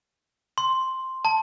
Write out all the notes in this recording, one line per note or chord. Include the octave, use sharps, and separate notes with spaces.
C6
A5